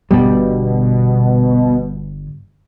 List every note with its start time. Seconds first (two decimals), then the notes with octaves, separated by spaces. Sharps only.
0.11 G1 G2 B2 G3